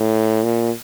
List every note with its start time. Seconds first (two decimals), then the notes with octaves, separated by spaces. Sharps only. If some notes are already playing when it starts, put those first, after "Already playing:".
Already playing: A2
0.43 A#2